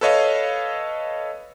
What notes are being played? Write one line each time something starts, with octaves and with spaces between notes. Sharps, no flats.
A4 B4 C#5 D#5 F5